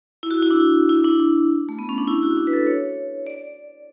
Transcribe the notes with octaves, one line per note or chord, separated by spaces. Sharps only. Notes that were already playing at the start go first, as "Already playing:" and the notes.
E4
F#4
E4
D4
E4
D4
D4
A3
B3
C#4
D4
E4
F#4
D4
B4
A4
C#5
D5